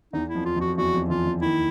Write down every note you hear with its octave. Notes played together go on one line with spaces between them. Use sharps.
E2 E3 D#4
E4
F2 F3
F4
F2 F3
F#4
E2 E3 F#4
F2 F3
E2 E3 F4
E2 E3
D#2 D#3 E4